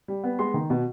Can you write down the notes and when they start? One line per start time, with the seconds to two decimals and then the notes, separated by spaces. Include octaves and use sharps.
0.08 G3
0.24 B3
0.39 G#3 C6
0.54 D#3
0.70 B2